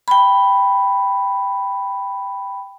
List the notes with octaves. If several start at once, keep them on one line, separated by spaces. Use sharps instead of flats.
G5 B5